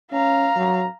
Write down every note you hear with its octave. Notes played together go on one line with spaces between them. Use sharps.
C#4 F5 A#5
F#3